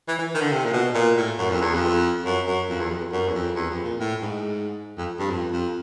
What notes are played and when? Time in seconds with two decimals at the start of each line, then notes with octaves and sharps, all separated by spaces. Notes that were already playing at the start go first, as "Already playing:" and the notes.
0.08 E3
0.19 E3
0.35 D#3
0.41 D3
0.52 C3
0.65 A#2
0.73 B2
0.95 A#2
1.17 A2
1.38 F#2
1.51 F2
1.61 E2
1.74 F2
2.25 F#2
2.47 F#2
2.69 F2
2.80 E2
2.90 F2
3.12 F#2
3.28 E2
3.34 F2
3.56 E2
3.70 F2
3.84 A#2
3.99 A2
4.22 G#2
4.97 F2
5.19 G2
5.30 F2
5.52 F2